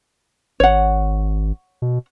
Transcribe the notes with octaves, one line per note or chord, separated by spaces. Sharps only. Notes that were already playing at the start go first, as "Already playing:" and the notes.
G#1 C#5 F#5
B2